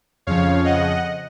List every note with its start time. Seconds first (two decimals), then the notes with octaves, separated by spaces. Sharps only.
0.27 F2 C#3 F3 C#5 F5
0.65 D#5 F#5